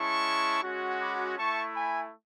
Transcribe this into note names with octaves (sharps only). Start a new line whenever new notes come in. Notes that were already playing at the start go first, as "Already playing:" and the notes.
Already playing: G#3 C#4 E4 A5 C#6
G#3 C#4 F#4
B5 D6
A3 E4 A5 C#6
G#5 B5